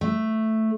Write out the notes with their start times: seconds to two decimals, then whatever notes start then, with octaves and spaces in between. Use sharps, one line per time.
0.01 A3